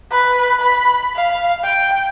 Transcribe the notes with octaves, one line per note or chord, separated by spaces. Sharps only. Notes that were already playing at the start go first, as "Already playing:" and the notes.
B4
B5
F5
G5